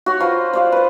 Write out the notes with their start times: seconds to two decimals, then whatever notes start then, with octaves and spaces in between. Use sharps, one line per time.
0.06 F#4 C#5
0.20 F4 B4 C5
0.53 C5 D5 F5
0.72 B4 C5